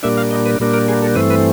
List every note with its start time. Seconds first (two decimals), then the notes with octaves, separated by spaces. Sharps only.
0.03 A#2 G3 A#3 D4 E5
0.17 F5
0.31 D#5
0.46 B4
0.60 A#2 G3 A#3 D4
0.74 A#4
0.88 G#4
1.02 A4
1.16 G2 E3 A3 C4 B4
1.30 B4